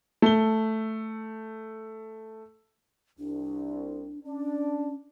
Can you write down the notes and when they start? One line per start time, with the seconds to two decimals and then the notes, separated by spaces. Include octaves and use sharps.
0.22 A3 G7
3.19 C2 D4
4.25 C#4 D4